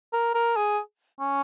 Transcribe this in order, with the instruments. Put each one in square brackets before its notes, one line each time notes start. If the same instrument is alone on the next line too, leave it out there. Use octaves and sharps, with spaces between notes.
[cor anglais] A#4
A#4
G#4
C#4